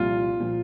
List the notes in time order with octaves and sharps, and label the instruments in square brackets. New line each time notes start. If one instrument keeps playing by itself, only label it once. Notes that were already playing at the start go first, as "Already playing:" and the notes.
Already playing: [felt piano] C2 A#2 F3 [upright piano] F4
[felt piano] A#2 F3